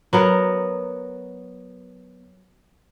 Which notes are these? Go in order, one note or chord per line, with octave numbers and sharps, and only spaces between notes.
F#3 B3 A#4